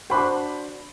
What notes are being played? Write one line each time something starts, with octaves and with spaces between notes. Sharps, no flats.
D4 F#4 C5 B5